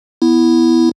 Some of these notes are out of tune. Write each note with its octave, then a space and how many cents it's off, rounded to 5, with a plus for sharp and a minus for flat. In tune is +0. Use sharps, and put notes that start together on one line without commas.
B3 +0 E4 +0